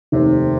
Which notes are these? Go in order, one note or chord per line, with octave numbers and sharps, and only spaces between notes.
F1 D#2 C3 D#3